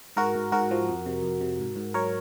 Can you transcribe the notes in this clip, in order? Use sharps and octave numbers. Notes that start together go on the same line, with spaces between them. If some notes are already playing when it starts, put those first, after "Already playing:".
G#2 F#4 A#4
G#2
G#2 F#4 A#4
F3
F2
C3
F2
C3
G#2
G#2
F#3 A#4 C#5